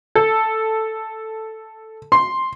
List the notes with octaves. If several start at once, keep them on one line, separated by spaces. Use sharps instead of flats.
A4
C6